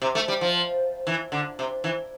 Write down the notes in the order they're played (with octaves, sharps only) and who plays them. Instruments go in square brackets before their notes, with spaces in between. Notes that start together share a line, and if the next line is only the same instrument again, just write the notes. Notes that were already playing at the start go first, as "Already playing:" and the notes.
[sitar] C3
A3
G3
F3
E3
D3
C3
E3